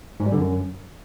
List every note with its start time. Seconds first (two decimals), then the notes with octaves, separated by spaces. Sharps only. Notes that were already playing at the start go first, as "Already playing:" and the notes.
0.20 G#2
0.26 G3
0.32 D3
0.38 F#2